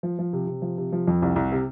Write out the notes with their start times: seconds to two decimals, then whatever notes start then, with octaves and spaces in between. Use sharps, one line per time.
0.03 F3
0.19 F3
0.33 C3
0.47 C3
0.62 F3
0.78 C3
0.92 F3
1.08 F2
1.22 C2
1.36 C2
1.52 C3